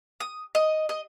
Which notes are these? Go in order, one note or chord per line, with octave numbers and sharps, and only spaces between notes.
D#6
D#5
D#5